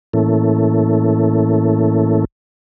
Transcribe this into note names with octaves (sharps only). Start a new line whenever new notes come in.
A2 E3 A#3 C#4 E4 A4